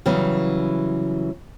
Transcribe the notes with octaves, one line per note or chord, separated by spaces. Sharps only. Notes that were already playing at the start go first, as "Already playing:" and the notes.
C#3 E3 F#3 G3 B3 C#4